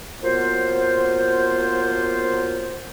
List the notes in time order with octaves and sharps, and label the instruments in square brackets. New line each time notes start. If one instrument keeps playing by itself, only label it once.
[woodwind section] F#3 A#3 B3 F4 C5